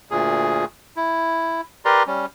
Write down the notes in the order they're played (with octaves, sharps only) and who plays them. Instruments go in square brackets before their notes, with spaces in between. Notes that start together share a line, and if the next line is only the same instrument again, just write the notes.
[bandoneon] D2 A#2 G#4
E4
G4 A#4 B4 D5 A#5 C6
G3 C#4